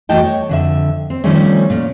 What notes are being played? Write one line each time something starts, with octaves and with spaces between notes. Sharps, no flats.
E2 A3 F#4 D#5 G5 A5
C#5
F2 D3 E5
C4
D#3 F3 G3 A3 C4 C#4
A#2 C#4